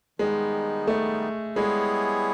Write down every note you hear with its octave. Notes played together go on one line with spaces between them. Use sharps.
D#3 G3 G#3 B3 D#4
A3
G3 G#3 B3 E4 G#4 C#5